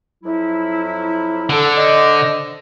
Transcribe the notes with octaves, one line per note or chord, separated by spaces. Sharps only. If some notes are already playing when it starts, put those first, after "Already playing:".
F2 F#3 E4
D3 A4
D4 C5 D#5